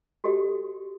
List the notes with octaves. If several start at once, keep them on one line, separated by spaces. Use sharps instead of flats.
F#4 G4 A4 D#5